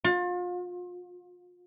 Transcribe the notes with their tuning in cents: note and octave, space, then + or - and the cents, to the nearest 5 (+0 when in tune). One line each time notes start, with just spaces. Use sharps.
F4 +35